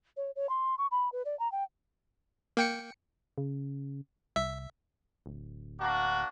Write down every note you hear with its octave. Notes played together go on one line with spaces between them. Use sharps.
C#5
C#5
C6
C#6
B5
B4
D5
A#5
G5
A#3 G5 C#7
C#3
C2 E5
D1
A#3 D4 F#4